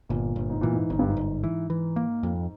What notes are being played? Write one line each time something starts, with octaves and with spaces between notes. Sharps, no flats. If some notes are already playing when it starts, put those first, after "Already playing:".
G1 A#2
G1
G#2
A#2 E3
G#2
G1 G#2
G2
G#2
G1
E3
E3
A#3
F2